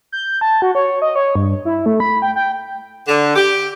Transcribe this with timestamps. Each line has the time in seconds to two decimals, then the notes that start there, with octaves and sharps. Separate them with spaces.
0.12 G6
0.41 A5
0.62 F#4
0.75 C#5
1.02 D#5
1.15 C#5
1.36 G2
1.65 E4
1.86 A3
2.00 B5
2.22 G5
2.36 G5
3.08 D3
3.35 G4